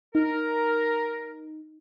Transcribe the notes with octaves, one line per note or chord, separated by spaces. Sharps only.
D#4 A#4